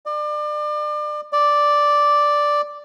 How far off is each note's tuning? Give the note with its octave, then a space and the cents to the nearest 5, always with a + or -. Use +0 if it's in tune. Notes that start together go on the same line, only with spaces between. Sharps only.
D5 +35
D5 +0